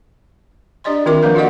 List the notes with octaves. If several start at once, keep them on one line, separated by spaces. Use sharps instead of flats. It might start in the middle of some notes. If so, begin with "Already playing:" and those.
D4 G4 D5 D#5 C6
D#3 C4 F4 A#4 E5 D6
F3 A#3 D4 A#4 B4 F5
F4 F#4 A4 D5 D#5 F#5